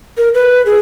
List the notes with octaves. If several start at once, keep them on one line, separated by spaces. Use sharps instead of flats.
A#4
B4
G#4